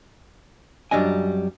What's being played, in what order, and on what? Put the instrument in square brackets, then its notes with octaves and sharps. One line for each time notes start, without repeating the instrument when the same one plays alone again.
[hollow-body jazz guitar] F#2 G3 D4 D#5 G#5